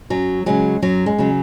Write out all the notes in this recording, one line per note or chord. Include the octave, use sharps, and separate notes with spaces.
F#2 F#3
C#3 F#3 G#3
F#2 F#3
G#3
C#3 F#3